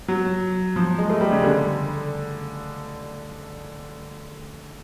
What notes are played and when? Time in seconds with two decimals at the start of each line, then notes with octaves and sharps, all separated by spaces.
0.08 F#3
0.76 F3
0.98 G#3
1.10 A3
1.21 G3
1.32 C#3
1.44 D3